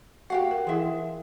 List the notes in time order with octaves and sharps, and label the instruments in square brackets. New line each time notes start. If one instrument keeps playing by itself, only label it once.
[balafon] F#4 [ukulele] G4 F5 F#5
[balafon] A#4
[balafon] E3 E4 [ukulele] G#4 E5